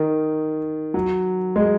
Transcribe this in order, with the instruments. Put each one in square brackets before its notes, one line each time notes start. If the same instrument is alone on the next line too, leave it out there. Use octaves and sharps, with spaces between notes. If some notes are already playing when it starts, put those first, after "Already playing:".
Already playing: [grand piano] D#3
F#3
G#3